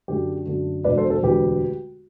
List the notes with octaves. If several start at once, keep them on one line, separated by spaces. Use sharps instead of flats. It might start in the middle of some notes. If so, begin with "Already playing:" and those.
F#2 D3 A3 G4
F#2 D3 A3
E1 D2 D3 A3 B4 D5
A4 C5
A4 C5
E1 D2 D3 A3 G4 B4